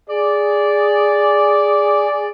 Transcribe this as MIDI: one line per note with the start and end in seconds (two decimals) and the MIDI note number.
0.10 2.30 68
0.10 2.30 74